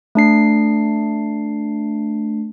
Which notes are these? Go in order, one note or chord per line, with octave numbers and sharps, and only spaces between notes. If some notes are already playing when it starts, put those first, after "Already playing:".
A3 D4 C7